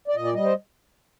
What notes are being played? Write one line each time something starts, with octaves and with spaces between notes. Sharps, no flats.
D5
A#2 D#5
D5
G3 D#5
C5